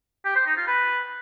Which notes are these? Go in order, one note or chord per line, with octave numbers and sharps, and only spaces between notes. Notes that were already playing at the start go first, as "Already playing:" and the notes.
G4
C5
D#4
F4
B4